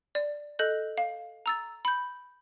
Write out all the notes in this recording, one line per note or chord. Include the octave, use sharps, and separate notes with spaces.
D5
A4 D#5 F#6 G6
F5
A#5 E6 A6
B5 G6